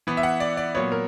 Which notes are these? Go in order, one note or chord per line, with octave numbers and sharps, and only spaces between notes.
E3 B3
E5
F#5
D5
D5
A#2 F#3 B3 C#5
A#4